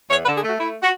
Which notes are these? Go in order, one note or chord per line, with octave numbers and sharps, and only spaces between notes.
E2 C#5
B4
D3
G#4
A3 F#4
A3 E4
F#4